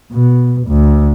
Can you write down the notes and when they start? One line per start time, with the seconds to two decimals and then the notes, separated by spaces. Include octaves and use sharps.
0.12 B2
0.68 D2